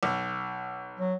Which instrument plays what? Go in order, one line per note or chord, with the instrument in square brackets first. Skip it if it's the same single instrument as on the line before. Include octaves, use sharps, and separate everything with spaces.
[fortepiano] B1
[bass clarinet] F#3